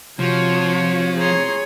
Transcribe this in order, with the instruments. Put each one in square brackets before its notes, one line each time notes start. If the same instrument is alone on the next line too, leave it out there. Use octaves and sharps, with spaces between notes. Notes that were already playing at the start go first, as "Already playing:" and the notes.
[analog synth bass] C3 [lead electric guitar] F3 [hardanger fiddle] F4 F#4 [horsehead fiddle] C#5
[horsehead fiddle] G#4 C#5 [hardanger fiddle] A#5 C6